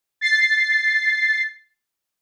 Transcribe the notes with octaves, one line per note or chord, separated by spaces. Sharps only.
A6 C7